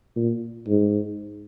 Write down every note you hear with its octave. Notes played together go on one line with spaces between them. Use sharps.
A#2
G#2